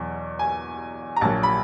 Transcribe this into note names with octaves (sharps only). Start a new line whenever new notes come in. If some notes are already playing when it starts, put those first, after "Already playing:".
Already playing: E2 B2 F#3
G#5
A#5
A#1 A#2 F#3 A5
B5